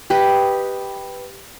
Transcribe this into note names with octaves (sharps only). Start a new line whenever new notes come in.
G4 B4 D#5